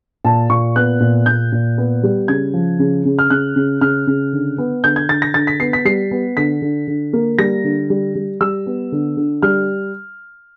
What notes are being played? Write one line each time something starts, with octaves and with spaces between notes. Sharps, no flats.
A#2 A5
A#2 C#6
B3 F#6
A#2
A#2 G6
A#2
B3
G3
C#3 G#6
F3
C#3
C#3
F6
C#3 F#6
C#3
C#3 F6
C#3
D3
B3
D3 G6
G#6
D3 A6
A#6
D3 A6
B6
B3 C7
B6
G3 C7
B3
D3 B6
D3
D3
A#3
G3 A#6
D3
G3
G3
G3 E6
B3
D3
D3
G3 F6